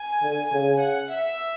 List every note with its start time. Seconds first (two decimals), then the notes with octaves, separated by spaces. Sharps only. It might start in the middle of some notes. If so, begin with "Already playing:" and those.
Already playing: G#5
0.22 D3
0.52 C#3
0.82 F#5
1.11 E5